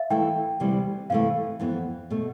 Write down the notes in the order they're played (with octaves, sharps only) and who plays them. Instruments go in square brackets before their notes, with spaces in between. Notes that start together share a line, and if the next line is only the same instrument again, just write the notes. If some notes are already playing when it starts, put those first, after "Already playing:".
Already playing: [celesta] E5 F5
[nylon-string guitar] E3 A3 E4 A4 [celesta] G5
[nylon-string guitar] D2 C3 E3 G3
[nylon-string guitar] C3 E3 A3 [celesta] F5
[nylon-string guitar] F2 E3 B3
B2 A3